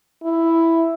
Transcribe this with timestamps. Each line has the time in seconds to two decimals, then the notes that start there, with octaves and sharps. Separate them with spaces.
0.24 E4